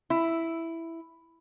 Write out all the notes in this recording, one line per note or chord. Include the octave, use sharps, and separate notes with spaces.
E4